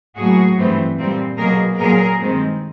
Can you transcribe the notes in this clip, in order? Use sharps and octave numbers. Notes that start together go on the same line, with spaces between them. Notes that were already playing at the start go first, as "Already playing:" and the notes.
A2 F#3 A#3 F#4 G#4
G2 E3 A3 C4
A#2 G3 C4
B2 F#3 A#3 G#4 A#4
A#2 F#3 A#3 G#4 A#4
G2 D#3 G#3 C4